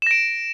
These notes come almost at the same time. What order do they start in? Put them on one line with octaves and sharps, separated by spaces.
E7 A#6 D7